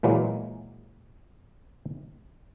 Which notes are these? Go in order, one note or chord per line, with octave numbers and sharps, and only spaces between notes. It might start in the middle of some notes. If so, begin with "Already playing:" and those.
A#2 E3 F#3 G#3 A#3